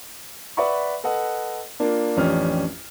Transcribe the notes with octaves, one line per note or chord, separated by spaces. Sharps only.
B4 D5 E5 F#5 B5 C#6
A4 B4 D#5 F#5
A#3 D4 F4
A1 F2 C#4 D4 G4 F6